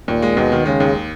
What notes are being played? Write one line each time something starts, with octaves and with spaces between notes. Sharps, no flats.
D#2 A#2
G#3
D#2 B2
D#3
C#3 G#3
D#2